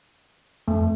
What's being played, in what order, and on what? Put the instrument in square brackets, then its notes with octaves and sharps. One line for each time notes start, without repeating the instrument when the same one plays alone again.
[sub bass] F2 [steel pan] A3